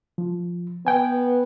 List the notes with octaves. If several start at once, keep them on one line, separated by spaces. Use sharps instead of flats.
F3
B3 G5 G#5